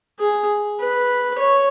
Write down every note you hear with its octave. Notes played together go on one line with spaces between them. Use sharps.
G#4
B4
C#5